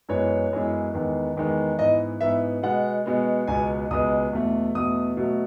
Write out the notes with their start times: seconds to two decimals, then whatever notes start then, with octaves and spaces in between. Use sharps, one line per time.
0.09 F#2 E3 G#3 B3 C#5
0.52 F#2 E3 G#3 B3
0.94 E2 D#3 G#3 B3
1.36 E2 D#3 G#3 B3
1.79 G#2 E3 B3 D#5
2.21 G#2 E3 B3 E5
2.63 B2 G#3 B3 F#5
3.06 B2 G#3 B3
3.48 C#2 B2 G#3 B3 G#5
3.91 C#2 B2 G#3 B3 D#6
4.33 E2 B2 A3
4.75 E2 B2 A3 D#6
5.17 B2 F#3 A3